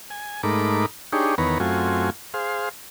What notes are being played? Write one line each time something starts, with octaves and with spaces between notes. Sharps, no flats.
G#5
G#2 A3 D#4 A#4 B5 D6
D4 D#4 G4 G#4 C#5
E2 D#3 B3 B4 C#5 A#5
F#2 A3 C4 F4 F#4 G#5
G#4 C5 F5